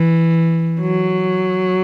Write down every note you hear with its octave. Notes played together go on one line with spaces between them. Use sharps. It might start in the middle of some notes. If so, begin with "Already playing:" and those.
Already playing: E3
F#3